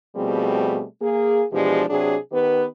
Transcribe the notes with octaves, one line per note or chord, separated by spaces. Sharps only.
B2 F3 G3 A3 C4 G#4
A#3 G#4
B2 E3 F3 G#3 D4 G4
C3 F#3 D4 G#4
D#3 B3 G4 B4